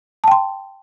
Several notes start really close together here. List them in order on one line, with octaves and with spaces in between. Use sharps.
A5 G5 C6